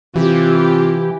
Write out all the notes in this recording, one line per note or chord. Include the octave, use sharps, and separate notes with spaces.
C3 E3 F4 G4